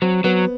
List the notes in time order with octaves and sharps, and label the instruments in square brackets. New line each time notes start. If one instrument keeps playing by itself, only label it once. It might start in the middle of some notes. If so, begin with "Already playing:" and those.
[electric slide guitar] F#3 [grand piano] C4
[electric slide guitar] F#3 [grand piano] B3